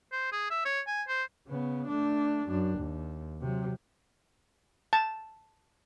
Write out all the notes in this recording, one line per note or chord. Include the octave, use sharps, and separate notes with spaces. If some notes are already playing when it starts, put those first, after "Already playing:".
C5
G#4
E5
C#5
G#5
C5
C#3 B3
A3 D4
F#2 D4
D#2
C3 F#3
A5